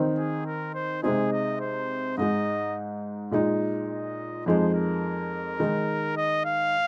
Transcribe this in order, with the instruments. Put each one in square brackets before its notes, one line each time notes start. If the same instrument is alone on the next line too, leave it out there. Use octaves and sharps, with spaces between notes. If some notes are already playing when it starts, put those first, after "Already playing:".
Already playing: [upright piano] D#3 C4 D#4
[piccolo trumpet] G#4
A#4
C5
[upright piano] C3 G#3 C4 D#4 [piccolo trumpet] G#4
[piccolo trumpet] D#5
C5
[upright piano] G#2 G#3 D#4 [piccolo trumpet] D#5
[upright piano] A#2 G#3 D#4
[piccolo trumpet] D#5
[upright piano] F2 F3 G#3 D#4 [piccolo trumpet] C5
[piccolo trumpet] A#4
[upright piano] D#3 G#3 D#4
[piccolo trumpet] D#5
F5